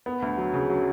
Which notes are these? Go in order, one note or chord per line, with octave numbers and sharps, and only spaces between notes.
B3
D2
F#3
C#3
F#3